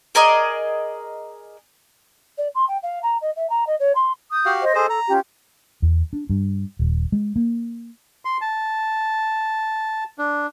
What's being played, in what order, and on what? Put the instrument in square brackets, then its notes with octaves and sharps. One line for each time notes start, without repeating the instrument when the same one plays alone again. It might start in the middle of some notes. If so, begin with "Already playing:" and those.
[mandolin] G#4 A#4 D5 D#5
[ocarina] D5
C6
G5
F5
A#5
D#5
E5
A#5
D#5
C#5
C6
[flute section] D#6 G6
[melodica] F#4 G4 F5
[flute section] C5 D#5
[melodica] G#4 C5 D#5 [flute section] A4
[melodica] A#5
[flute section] C#4 F4 G4
[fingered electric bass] E2
D4
G2
D#1
G#3
A#3
[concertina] C6
A5
D4